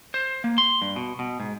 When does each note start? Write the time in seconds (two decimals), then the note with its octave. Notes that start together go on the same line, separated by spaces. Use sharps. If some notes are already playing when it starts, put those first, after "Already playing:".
0.14 C5
0.44 A#3
0.58 C6
0.82 G2
0.96 B2
1.19 B2
1.40 G#2